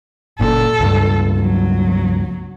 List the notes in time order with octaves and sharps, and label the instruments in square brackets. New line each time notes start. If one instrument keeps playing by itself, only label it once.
[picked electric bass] F#1 A#2 [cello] A4
[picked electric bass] C#2 G2
[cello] F#3